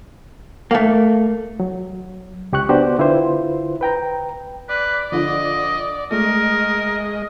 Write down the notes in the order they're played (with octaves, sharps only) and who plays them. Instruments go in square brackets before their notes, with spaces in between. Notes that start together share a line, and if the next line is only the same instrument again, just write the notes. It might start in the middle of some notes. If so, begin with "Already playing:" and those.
[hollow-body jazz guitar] A3 A#3
[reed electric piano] F#3
C#2 G4 C#6 F#6
B3 D4 F#4 G4 C5
D3 E4 F4 B4 C5
B4 G5 A#5
[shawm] B4 [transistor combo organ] D5
[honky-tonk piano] D3 F3 [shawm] D#5
[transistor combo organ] G#3 D#5 [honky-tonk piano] A3 [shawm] A#4